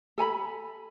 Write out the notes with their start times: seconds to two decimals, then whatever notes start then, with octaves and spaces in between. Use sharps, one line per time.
0.18 A4 G#5 A#5 B5